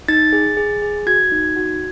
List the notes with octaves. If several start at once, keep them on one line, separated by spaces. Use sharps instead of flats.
D#4 A6
G#4
G#4
G#4
F#4 G#6
D#4
F#4